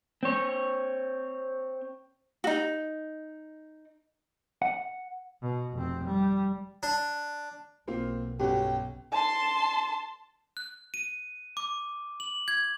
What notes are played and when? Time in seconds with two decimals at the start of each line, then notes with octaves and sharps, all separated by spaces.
0.23 C4 C#5
2.44 D#4 F#4
4.62 F#5
5.42 B2
5.73 F1 C4
6.04 G3
6.83 D4
7.87 B1 A#3 C4 F4
8.40 G1 C#4 F#4 G4 G5
9.12 A5 C6
10.57 F#6
10.94 D#7
11.57 D6
12.20 F#7
12.48 G#6